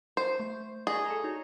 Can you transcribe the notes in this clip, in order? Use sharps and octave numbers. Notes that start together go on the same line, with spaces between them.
C5
A3 G6
G#4 D5 D#5 C#6
A4 A5 A#5
D#4 F#4 C#5